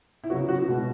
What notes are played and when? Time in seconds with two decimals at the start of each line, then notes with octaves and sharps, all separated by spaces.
0.24 E4
0.30 C#3 F#3 B3 F#4
0.49 F#4
0.68 B2 G#3 B3